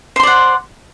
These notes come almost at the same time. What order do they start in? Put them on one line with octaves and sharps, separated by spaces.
C5 C6 D5 F#5